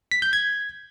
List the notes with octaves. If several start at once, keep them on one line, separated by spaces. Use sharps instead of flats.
B6
G6
G#6